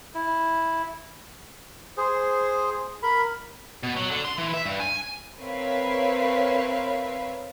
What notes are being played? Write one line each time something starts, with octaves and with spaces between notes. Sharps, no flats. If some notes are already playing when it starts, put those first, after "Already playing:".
E4
G#4 C5
A#4 B5
B2
F#3
D3
C6
E3
E5
G2
G#5
C4 A#4 B4 C#5 E5 F5